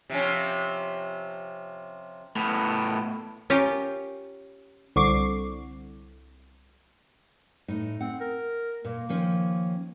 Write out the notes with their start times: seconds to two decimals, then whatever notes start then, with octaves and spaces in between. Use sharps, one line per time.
0.10 C3 F3 C#4
2.36 A2 B3
3.50 C#4 F4 G4 A#4
4.96 C2 D3 C#6 D6 C7
7.68 A2 D#4
8.01 C4 F#5
8.20 A#4
8.85 A#2 A#3
9.09 D#3 F3 C#4